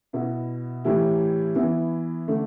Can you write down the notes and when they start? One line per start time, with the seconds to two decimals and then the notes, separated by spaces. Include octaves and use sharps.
0.13 B2 B3 E4
0.85 A2 E3 G3 E4
1.56 E3 B3 E4
2.28 D3 A3 D4